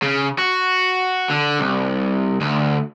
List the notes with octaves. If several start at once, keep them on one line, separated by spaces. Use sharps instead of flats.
C#3
F#4
D3
C2
D2